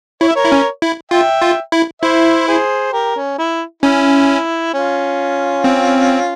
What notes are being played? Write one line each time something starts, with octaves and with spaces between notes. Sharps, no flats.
E4 C#5
E5
A#4 C#5
E4
C#4
E4
F4 E5 G5
F4
E4
E4 C5 E5
G#4 C5
G4 A#4
C#4
E4
C#4 E4
C#4 F4
C4